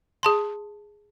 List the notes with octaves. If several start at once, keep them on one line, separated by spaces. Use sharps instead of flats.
G#4 A5 C6